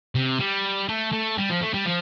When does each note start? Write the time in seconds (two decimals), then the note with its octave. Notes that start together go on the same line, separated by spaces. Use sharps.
0.15 C3
0.40 G3
0.89 A3
1.12 A3
1.38 G3
1.50 F3
1.62 A3
1.74 G3
1.86 F3